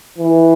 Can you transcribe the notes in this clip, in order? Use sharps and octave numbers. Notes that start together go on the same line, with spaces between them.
E3